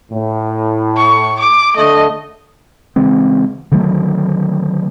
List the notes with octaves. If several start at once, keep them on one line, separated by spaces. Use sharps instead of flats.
A2
C#6
D6
D3 A3 D#5
C#3 E3 G#3 C4
D3 D#3 F#3 A3